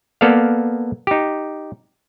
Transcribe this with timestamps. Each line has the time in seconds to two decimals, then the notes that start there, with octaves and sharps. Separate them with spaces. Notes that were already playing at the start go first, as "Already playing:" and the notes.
0.21 A#3 B3 A4 D5 F5
1.07 D#4 G4